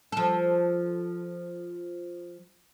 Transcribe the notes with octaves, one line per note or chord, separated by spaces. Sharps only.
F3 A4